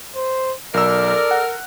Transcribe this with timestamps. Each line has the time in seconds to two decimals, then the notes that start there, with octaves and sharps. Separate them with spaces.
0.15 C5
0.74 B1 A4 A#4 D5 E6
1.31 F#5